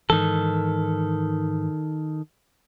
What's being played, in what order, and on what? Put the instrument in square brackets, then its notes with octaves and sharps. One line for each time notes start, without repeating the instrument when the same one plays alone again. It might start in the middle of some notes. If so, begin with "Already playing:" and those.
[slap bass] G#2 E3 [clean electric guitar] D#3 A4